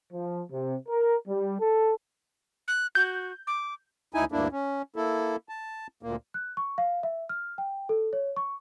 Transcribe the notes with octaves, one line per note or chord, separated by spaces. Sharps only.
F3
C3
A#4
G3
A4
F#6
F#4 G6
D6
D2 D#4 E4 G#5
D2 G2 A#3 D4 E4
C#4
A#3 E4 A4
A5
D2 A#2 A#3
F#6
C#6
F5
E5
F6
G5
A4
C#5
C#6